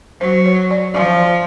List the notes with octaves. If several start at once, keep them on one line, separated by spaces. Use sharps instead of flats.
F#3 C5
C#5
D5
F3 D5